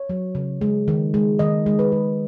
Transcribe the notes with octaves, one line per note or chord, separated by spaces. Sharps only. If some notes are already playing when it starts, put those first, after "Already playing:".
Already playing: C#5
F#3
C#3
G#3
D#3
G#3
D#3 D#5
G#3
B4
G#3